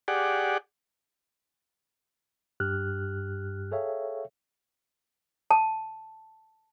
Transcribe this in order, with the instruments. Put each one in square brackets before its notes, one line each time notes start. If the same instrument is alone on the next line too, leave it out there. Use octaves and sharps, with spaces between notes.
[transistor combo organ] G4 G#4 D5 F#5
[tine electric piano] G2 G4 F6 F#6
G#4 A4 C#5 E5 F5 G5
[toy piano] A5